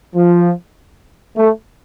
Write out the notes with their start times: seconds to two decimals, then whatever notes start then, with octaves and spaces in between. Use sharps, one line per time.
0.15 F3
1.37 A3